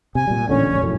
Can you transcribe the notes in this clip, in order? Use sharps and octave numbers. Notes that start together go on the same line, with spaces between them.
C3 G#5
A#2 G3
A1 A#2 D3 C#4
F1 A#1
F1 F#2 A2